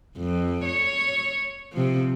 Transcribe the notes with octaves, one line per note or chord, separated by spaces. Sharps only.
F2
C#5
C3 F3